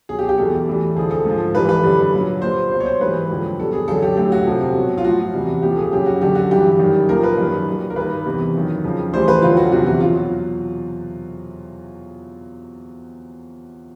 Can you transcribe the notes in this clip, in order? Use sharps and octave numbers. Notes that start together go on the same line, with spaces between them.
B2 F#3 G#4
G4
G4
E2 B2 G3 A4
A2 E3 G3
F2 D3 F3 G#4
A4
G#2 F3
G2 E3 G3 B4
B4
F#2 D3 G3
A#2 F#3
A#2 G3 C5
B2 F#3 C5
C#5
C5
G#2 E3 G3 B4
F2 D3 F#3
B2 G3 A4
G#4
F#2 D3 F#3 A4
G4
A2 F#3 G4
F#4
F2 C3 F3
B2 F#3
F4
A2 F3 F#4
E2 C3 E3 G3
A#2 F3 G4
A4
G#4
F#2 C#3 F#3 G4
F#4
F#2 D3 F#3 G4
F#4
G2 E3 G3 G4
F#2 D#3 G3
A#2 F3 A#4
B4
F#2 D#3 G3
A#2 G3
A#4
G2 D#3 G3 B4
E2 C3 E3
F#2 D#3 F#3
F2 C#3 F3
A2 E3 G3 C5
B4
F2 D3 F#3 F4
F#4
E2 C3 E3 F#4
F#4
B2 F#3 F4